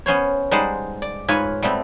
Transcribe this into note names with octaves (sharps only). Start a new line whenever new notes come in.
B3 C#4 C5 C#5
G3 G#3 D#4 C5 F#5 A5
D5
G#2 F4 B4 C#5 G#5
G3 A3 B3 C4